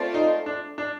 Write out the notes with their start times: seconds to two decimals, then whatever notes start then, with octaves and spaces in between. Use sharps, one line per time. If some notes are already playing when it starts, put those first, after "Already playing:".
Already playing: A3 C4 F4 A4 D5
0.14 D#4
0.46 D4
0.78 D4